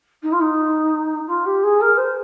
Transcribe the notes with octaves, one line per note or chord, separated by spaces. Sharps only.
D#4
F4
D#4
F4
G4
G#4
A#4
C5